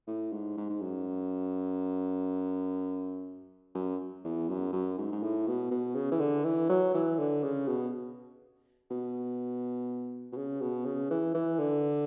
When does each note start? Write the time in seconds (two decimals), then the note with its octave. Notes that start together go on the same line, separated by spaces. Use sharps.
0.07 A2
0.32 G#2
0.57 G#2
0.69 G#2
0.81 F#2
3.75 F#2
4.24 E2
4.48 F#2
4.73 F#2
4.98 G#2
5.12 G#2
5.23 A2
5.47 B2
5.71 B2
5.95 C#3
6.11 E3
6.20 D3
6.44 E3
6.69 F#3
6.94 E3
7.19 D3
7.43 C#3
7.68 B2
8.90 B2
10.32 B2
10.37 C#3
10.61 B2
10.85 C#3
11.11 E3
11.34 E3
11.59 D3